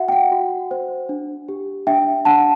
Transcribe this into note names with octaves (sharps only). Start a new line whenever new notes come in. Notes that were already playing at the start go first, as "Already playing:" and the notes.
Already playing: F#4 E5 F#5
G5
F#5
F#4
C5
D4
G4
D4 E5 G5
D4 F#5 A5